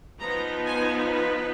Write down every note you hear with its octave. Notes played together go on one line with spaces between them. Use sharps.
F3 B3 D#4 A#5
G#5
B4